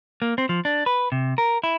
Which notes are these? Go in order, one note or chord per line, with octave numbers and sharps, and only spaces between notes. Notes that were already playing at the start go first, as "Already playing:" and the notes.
A#3
C4
F3
D4
B4
C3
A#4
E4